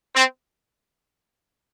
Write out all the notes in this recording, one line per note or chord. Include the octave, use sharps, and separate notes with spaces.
C4